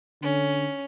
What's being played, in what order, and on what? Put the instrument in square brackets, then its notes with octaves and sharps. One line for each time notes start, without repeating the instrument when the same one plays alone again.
[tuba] D3 [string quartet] C#4